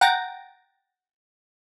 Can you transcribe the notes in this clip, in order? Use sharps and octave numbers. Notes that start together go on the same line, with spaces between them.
F#5 G5 A#5 A6 A#6 D7